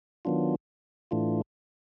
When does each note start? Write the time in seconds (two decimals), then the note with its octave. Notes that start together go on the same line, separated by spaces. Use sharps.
0.25 D#3 F#3 B3 D4 F4
1.11 A2 E3 A3 D4 F4